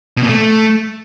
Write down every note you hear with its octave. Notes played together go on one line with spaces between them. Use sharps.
B2
A#2
A3